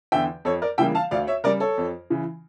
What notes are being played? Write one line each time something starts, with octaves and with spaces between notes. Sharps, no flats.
E2 D3 E5 G5
F2 A4 C#5
A#4 D5
C#3 E3 G3 A#3 E5 G5
F5 A5
D2 D5 F5
C#5 E5
C#3 G3 A#4 D5
A4 C#5
F2
C#3 E3